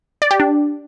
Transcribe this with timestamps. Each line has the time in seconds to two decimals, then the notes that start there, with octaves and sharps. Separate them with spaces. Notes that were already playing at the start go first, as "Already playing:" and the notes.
0.22 D5
0.31 G4
0.40 D4